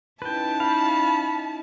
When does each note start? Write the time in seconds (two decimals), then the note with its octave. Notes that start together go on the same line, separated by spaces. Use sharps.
0.22 C#4 D#4 E4 B4 G5 A5
0.60 F5 B5